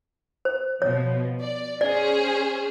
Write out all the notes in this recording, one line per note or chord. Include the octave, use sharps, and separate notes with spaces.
C5
B2 F3 C#5
D5
C#4 G#4 C5 D5